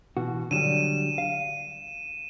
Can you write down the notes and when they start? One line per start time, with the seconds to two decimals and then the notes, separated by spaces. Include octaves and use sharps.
0.17 B2 E3 F#4
0.51 D3 F#3 G3 D#7 E7
1.18 F5